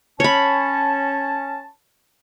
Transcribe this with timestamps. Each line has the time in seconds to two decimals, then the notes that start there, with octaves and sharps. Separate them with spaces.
0.20 C#4 C#5 A5 B5